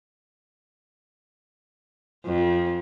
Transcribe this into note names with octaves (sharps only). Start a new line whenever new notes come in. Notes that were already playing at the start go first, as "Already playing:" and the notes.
F2